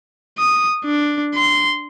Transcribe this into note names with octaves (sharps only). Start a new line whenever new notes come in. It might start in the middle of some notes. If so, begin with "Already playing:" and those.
D#6
D4
C6